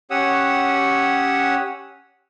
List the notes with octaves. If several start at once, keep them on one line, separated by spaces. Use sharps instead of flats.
C#4 G4 C#5 F#5 D#6 E6